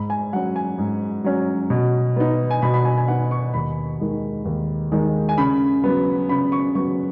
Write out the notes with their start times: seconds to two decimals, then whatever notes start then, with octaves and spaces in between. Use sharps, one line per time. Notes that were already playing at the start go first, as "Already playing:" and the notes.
Already playing: G#2 B5
0.10 G#5
0.33 F#3 C#4 F#5
0.56 G#5
0.78 G#2
1.24 F#3 C#4
1.70 B2
2.16 B3 D#4
2.51 G#5
2.62 B2 B5
2.74 B5
2.85 G#5
2.98 G#5
3.08 B3 D#4 F#5
3.31 C#6
3.54 D#2 B5
4.00 D#3 G#3
4.45 D#2
4.92 D#3 G#3
5.29 G#5
5.38 C#3 B5
5.84 F#3 B3
6.29 C#3 B5
6.52 C#6
6.75 F#3 B3 C#6